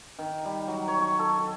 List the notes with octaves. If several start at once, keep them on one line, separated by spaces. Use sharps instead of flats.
D#3
G3
F#3
C#5
C#6
A4
A4